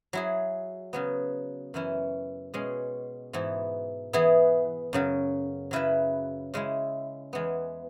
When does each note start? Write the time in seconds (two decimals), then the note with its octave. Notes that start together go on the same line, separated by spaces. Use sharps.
0.13 F#3 E4 G#4
0.93 C#3 F#3 B3
1.74 F#2 E3 C#4 E4
2.54 B2 G#3 C#4 G#4
3.33 G#2 E3 B3 E4
4.13 E3 B3 E4 G#4
4.93 F#2 C#3 F#3
5.71 C#3 F#3 E4 B4
6.54 C#3 G#3 E4
7.33 E2 E3 G#3 B3